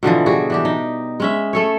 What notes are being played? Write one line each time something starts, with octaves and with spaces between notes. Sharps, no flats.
B2 D3 E3 F3
G3 F#4 G#4
E3 D4 G4
D#4
G#3 C#4 E5
A3 A4 C#5